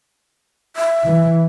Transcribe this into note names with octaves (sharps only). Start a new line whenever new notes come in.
E5
E3